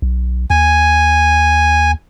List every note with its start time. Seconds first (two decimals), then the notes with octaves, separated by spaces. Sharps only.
0.02 B1
0.50 D#2 G#5